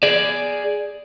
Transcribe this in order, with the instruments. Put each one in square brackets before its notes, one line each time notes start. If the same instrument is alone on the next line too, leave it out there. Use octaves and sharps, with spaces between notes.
[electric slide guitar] G#4 D5